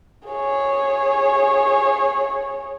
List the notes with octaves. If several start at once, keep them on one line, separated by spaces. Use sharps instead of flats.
G#4 C#5